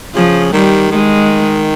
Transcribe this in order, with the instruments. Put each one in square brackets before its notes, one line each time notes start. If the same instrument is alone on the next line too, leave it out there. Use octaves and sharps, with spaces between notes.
[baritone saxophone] C#3 [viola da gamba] F3
[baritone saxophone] D#3 [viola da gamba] G3
[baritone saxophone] D#3 [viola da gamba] G#3